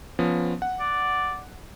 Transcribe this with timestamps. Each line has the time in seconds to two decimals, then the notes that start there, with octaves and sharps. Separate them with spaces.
0.19 F3 B3 C#4
0.62 F#5
0.80 D5